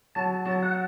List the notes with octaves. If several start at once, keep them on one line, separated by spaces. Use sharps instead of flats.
F#3 A5
F#3 A5
F#5